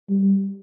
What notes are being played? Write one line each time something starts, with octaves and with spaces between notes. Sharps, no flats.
G3